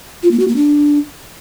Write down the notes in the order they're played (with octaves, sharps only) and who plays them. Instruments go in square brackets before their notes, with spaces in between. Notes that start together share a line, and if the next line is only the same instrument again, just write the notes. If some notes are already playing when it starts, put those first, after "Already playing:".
[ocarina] F4
A#3
F#4
A#3
D4